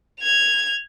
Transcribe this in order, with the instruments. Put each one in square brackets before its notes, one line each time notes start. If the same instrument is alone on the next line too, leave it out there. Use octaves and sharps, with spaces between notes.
[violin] G#6 F7